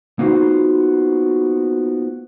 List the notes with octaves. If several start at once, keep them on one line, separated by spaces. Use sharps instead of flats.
A#3 B3 D#4 F4 F#4 C5